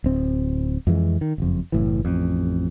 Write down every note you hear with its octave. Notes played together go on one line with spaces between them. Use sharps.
D1 C4
F2 E3 G#3
D#3
F#1 F2
F#1 A2 E3
A1 F2